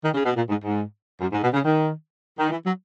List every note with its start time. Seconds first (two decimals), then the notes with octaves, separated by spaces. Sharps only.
0.03 D#3
0.14 C#3
0.24 B2
0.36 A#2
0.49 G#2
0.64 G#2
1.21 F#2
1.32 G#2
1.43 B2
1.54 C#3
1.64 D#3
2.38 D#3
2.50 E3
2.64 F#3